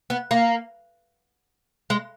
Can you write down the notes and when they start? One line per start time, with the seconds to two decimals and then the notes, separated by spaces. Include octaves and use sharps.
0.10 B3
0.31 A#3
1.90 G#3